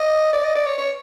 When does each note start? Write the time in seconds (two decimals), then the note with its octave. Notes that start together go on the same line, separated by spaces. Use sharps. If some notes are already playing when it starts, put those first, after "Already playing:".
Already playing: D#5
0.33 D5
0.44 D#5
0.55 D5
0.66 C#5
0.78 C#5